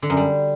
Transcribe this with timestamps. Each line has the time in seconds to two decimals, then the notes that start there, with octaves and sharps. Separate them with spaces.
0.02 D3
0.10 F#2
0.17 G3